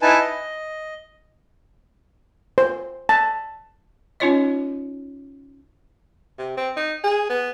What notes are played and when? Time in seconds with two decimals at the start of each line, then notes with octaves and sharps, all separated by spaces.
0.02 D#4 E4 B4 G#5 A5
0.20 D#5
2.58 C5
3.09 A5
4.20 C#4 D#4 F4 C#5 D#5
6.38 C3
6.57 C4
6.77 D#4
7.04 G#4
7.29 B3